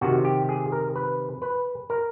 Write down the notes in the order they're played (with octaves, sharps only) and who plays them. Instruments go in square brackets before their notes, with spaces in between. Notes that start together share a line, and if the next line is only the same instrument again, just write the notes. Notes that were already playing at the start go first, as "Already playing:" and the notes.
[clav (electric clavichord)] C3 D#3 F#4
G4
G#4
A#4
B4
B4
A#4